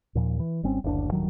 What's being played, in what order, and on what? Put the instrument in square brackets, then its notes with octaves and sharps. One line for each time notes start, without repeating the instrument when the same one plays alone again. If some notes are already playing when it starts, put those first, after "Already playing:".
[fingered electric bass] D#2 A#2 F3
E3
G#1 G3 C4 C#4
F#1 D2 D4
D1 G2 D#3 F#3